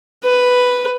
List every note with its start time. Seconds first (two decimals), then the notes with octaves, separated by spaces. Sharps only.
0.24 B4